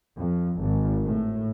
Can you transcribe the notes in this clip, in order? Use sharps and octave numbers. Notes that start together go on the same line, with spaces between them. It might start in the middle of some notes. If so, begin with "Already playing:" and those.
F2
G#1
A2